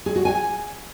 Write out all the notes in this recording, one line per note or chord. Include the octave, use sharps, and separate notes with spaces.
G#4
F#4
G#5